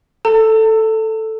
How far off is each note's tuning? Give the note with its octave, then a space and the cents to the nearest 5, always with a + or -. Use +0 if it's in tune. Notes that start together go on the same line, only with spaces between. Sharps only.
A4 +0 A5 +45